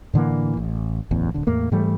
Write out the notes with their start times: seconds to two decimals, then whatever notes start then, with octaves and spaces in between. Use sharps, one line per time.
0.14 A2 D3 E3 A#3
0.57 A1
1.11 D1 A1 E2
1.34 D1 D3
1.47 E2 A2 A#3
1.72 G#2 E3 G3 A3